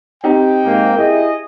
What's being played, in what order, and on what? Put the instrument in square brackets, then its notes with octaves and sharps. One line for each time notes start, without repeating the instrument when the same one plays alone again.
[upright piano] C4 D#4 G4 [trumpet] G5
[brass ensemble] G#2 A#3
E4 G#4 D#5